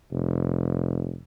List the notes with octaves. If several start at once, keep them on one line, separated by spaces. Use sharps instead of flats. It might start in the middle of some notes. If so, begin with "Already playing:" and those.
F1